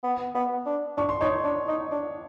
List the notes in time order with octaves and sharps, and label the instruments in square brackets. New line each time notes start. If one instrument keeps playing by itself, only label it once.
[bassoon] B3
B3
D4
[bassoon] D4 [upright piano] C#6
[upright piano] C6
[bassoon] D#4 [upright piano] C#5 C#6
[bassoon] D4
D#4
D4